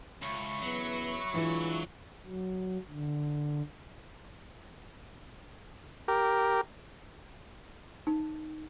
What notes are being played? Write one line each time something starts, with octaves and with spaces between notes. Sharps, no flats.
C#2 E5 B5 C#6
C#3 E3 F#3 B3
E3 G#3 D4 F4
F#3
D3
G4 A#4
D#4